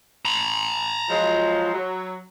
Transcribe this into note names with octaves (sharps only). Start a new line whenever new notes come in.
A#5 B5
F3 F#3 G#3
F#3